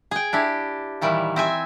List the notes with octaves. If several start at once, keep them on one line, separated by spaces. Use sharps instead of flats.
G#4 G5
D4 E4 G4
A#2 D#3 E3 G3
C4 E5 G#5